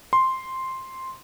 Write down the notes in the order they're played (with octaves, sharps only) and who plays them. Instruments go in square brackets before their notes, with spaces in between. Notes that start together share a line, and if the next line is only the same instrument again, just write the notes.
[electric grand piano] C6